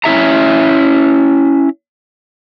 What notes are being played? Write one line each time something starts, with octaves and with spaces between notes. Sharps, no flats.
C#4 E4 E5 A#5